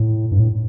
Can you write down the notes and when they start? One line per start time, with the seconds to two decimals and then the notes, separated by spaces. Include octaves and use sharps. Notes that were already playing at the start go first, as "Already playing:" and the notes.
Already playing: A2
0.32 G2
0.40 A2